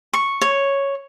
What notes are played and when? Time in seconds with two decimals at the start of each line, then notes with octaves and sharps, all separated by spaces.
0.13 C#6
0.41 C#5